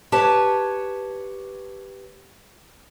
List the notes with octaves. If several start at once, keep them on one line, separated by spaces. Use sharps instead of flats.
G4 B4 C#5 A5